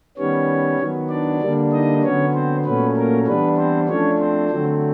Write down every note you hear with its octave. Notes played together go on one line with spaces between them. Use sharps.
D#3 G3 B3 C#4 C#5
D#3 F#3 B3
D4 D5
D3 G3 A#3 D4
D#4 D#5
D3 F#3 B3 C#4 C#5
C4 C5
A#2 F#3 A3 B3 C#4 B4
A#3 A#4
E3 G3 B3 D4 B4
C4 C5
F3 A3 C#4 D4 C#5
C4 C5
D3 F#3 A3 C4